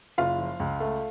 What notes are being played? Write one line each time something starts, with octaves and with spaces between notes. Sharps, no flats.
F#1 F4 F5
F3
C#2
A3